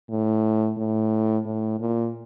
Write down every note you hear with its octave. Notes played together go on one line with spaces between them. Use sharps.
A2
A2
A2
A#2